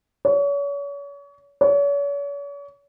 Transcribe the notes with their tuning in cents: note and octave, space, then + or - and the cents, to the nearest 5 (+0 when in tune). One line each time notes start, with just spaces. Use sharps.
C#5 +35
C#5 +40